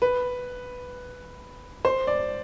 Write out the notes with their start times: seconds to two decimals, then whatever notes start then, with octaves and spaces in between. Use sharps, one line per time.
0.02 B4
1.85 C5
2.07 D5